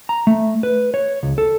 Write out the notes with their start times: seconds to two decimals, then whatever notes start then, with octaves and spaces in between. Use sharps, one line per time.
0.09 A#5
0.27 A3
0.63 B4
0.94 C#5
1.23 C#2
1.38 A4